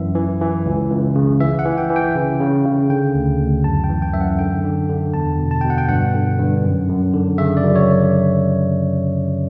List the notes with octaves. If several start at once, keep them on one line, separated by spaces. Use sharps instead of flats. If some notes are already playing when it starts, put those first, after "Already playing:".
Already playing: F#2 E3 E5
E3
E3
C#2
C#2
C#3
E3 E5
F#5
E3
G5
E3
G5
C#3
C#3
C#3
D3 G5
D2
D2
F#2 A5
G5
E3
G5
F#2 E5
F#5
D3 G5
D3
D3
E2 A5
B2
A5
B2 G5
F#5
G5
G2 F#5
D3
G2
F#2
F#2
D3
C#3 E5
D5
F#2
C#5